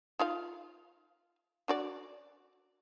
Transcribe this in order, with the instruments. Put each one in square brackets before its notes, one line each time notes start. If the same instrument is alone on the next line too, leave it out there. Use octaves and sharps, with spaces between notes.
[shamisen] D#4 F4 F5
D4 F#4 D5